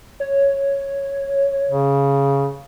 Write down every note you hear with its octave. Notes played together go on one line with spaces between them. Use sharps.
C#5
C#3